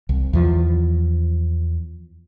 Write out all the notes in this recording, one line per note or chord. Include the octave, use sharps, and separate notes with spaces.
C2
E2 F3